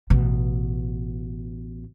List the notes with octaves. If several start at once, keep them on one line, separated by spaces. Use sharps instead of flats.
A1 B2